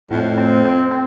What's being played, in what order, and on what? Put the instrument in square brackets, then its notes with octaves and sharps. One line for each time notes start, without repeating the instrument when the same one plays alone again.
[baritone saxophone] F2 [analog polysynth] A2
[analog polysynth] C4
C4
C4